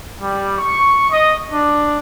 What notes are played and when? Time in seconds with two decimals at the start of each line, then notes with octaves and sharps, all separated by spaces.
0.21 G3
0.58 C#6
1.11 D#5
1.52 D4